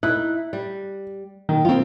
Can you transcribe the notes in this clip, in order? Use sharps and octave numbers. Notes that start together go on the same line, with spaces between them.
D#4 E4 F#6
G3
D#3
F3 C4 F4